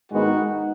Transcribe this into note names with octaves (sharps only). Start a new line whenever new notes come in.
G#2 D#3 G#3 B3 D#4 F#4